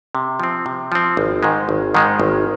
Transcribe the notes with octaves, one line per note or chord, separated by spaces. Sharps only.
C3
F3 C4
C3
F3 C4
G#1
G#2 D#3 G#3
G#1
G#2 D#3 G#3
G#1